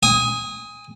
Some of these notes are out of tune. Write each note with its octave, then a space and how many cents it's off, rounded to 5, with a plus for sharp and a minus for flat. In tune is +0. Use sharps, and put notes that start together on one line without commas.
G#5 -25 D#6 +15